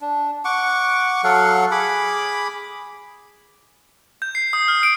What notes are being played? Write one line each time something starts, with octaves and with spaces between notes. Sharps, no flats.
D4
F#5 C#6 D6
F#3 A4 F5 F#5
G#4 B5 D6
G6
C7
D#6
F6
D7